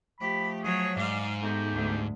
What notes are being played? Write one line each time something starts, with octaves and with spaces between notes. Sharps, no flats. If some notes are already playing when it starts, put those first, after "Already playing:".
F3 A3 G4 B5
F#3 G#4 C#5
G#2 D5 F5
G#3 A3 B3 D#4 G4
D2